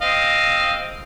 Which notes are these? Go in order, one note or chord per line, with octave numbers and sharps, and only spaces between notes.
C4 D#5 F5